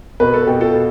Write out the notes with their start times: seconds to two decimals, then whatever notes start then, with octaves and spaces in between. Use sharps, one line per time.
0.20 B2 B4
0.34 A4
0.46 B2 G4
0.60 F4 A4
0.73 B2